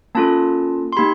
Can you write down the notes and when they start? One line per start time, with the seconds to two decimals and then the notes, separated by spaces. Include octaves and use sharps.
0.15 A#3 C#4 F4 A4 A5
0.93 C6
0.97 A#3 D#4 G4 B5